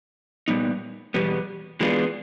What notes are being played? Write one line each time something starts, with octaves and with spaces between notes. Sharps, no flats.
A#2 G3 B3 D#4
E2 B2 G3 B3
E3 G#3 B3 D4 F4